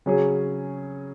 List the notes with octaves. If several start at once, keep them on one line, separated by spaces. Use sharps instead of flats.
C#3 F#3 C#4 G#4